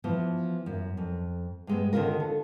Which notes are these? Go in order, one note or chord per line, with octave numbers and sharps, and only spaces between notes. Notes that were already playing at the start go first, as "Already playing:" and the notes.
E3 F3 B3
F#2
F2
G2 G#3 B3
D3 D#3 F#3 C#4 F4 A#4
A4